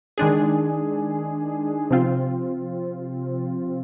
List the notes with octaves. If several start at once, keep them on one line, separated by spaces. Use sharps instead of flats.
D#3 G#3 D4 G#4
C3 F3 C4 F4